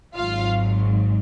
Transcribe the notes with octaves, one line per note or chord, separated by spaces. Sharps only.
G#1 G#2 F#3 F4 F5